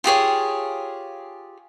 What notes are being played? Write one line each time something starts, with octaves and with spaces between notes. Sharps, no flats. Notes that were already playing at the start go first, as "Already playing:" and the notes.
F4 G4 G#4 C#5